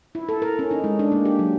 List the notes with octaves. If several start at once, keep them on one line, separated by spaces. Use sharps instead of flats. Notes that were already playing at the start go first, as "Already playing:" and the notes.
E4
A4
A#4
C#4
D#4
G#3
D4
A#3
G4
F#3